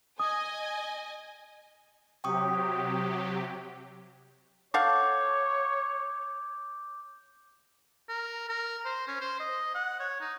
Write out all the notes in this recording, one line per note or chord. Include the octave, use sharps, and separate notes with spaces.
D#5 G#5 D#6
C3 F#3 G4 G5 C#6 D#6
A4 C#5 F5 F#5 D6 G6
A#4
A#4
C5
C#4
C5
D#5
F#5
C#5
D#4